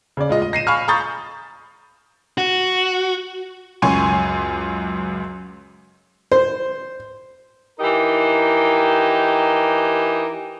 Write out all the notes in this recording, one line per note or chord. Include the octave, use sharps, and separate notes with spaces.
C#3 D5
G#3 F4 D#5
D#5
A#6 C7 D#7 E7
F5 G#5 B5 C#6 F6
A#5 B5 C#6 D#6 G6 A6
F#4
C#2 F#2 G#5 C6 C#6 D#7
C5
E3 D#4 G4 A#4